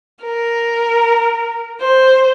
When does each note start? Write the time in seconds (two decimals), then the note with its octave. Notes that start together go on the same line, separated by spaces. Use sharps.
0.23 A#4
1.81 C5